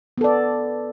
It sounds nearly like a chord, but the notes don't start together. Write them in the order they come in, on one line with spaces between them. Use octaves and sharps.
B3 A4 D5